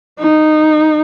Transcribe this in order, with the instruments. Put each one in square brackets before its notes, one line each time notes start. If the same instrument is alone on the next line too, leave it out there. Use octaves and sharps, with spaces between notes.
[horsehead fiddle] D#4